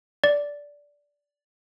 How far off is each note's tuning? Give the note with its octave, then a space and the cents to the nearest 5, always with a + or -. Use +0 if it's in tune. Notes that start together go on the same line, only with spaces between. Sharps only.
D5 -10